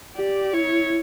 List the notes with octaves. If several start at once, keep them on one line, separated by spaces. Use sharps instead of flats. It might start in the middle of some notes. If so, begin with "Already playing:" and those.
G4 D5
E4 C#5